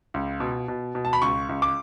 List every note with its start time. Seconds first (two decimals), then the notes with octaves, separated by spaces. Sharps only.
0.14 C#2
0.40 B2
0.68 B2
0.95 B2
1.05 A5
1.13 B5
1.22 C#2 C#6
1.49 C#2
1.62 D6